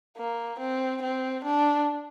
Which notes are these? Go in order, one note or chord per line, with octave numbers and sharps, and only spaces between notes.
A#3
C4
C4
D4